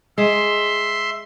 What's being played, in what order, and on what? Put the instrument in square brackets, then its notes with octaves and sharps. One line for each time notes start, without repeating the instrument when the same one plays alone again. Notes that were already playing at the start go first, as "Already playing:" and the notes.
[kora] G#3 [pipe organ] E5 C6